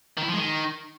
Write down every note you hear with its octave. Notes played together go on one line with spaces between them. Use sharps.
D#3
E4
F3
G#3
D#3